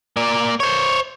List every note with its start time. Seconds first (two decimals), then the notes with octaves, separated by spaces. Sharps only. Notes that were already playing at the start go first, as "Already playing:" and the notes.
0.17 A#3 D5
0.60 C5 C#5